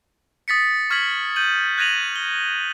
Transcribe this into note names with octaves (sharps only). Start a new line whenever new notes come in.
D#6 A6 B6 C#7
C#6 F6 G#6 B6 F#7
G6 D#7 F#7
F#6 G#6 A#6 D#7 F7 F#7
G7